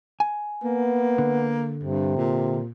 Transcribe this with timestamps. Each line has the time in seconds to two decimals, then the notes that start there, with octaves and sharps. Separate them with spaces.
0.20 G#5
0.64 A#3 B3
1.18 D3
1.83 G2 C3
2.17 A#2